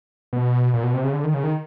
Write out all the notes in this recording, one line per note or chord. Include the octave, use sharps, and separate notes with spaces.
B2
A#2
B2
C3
C#3
D3
D#3
C#3
D#3